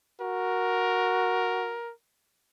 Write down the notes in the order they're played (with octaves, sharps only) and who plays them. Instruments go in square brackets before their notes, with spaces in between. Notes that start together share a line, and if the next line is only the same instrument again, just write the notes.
[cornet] F#4 [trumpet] A#4